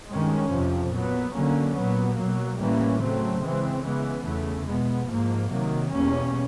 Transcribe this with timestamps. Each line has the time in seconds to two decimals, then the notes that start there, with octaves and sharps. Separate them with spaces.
0.10 G2 D#3 G#3 C#4
0.52 F2 C3 F3
0.92 A#2 F#3 B3
1.34 D3 F#3 A#3 C#4
1.76 A#2 F#3 B3
2.18 B2 F#3 A#3
2.59 A2 E3 G3 A#3 C#4
3.01 C#3 F#3 A3 C4
3.43 C#3 E3 G#3 C4
3.84 C#3 E3 G#3 B3
4.25 E2 C#3 E3 A3
4.67 B2 G#3 B3
5.08 G#2 F3 A#3
5.49 C3 D#3 F#3 A#3
5.92 E2 B2 G3 A#3 C#4